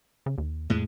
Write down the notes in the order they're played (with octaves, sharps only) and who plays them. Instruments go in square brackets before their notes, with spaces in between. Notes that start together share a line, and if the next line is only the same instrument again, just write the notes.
[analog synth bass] C#3
D#2
[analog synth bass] F2 [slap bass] A2 G#3